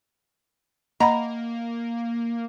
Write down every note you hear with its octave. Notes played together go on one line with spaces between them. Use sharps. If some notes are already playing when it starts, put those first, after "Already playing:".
A#3 D#5 F#5 A#5 B5